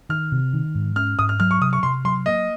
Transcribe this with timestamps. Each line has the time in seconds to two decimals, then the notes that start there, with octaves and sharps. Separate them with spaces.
0.09 D#3 F6
0.32 C3
0.53 D#3
0.75 G#2
0.96 C#4 F6
1.19 G#2 D#6
1.29 F6
1.40 F#3 F6
1.51 C#6
1.61 C3 D#6
1.73 C#6
1.83 C3 C6
2.05 F#3 C6
2.26 A#3 D#5